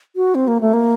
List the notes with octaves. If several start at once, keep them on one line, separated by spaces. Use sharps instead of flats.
F#4
C4
A#3
A3
A#3